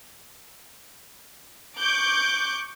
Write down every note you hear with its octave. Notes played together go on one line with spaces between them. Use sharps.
C#6 D6 F#6 G6 D7